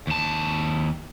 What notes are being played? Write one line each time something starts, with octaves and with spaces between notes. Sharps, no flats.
D#2 A5